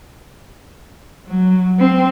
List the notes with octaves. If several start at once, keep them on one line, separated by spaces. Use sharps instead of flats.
F#3
C4